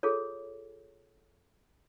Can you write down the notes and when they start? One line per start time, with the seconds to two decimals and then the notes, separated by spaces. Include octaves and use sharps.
0.03 F4 G#4 A4 C#5